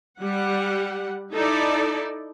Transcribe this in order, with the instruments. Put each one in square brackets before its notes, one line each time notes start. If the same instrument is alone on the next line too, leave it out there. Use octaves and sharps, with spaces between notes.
[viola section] G3 F#5
D#4 E4 A4 D5